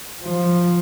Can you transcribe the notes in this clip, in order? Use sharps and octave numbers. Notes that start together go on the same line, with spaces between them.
F3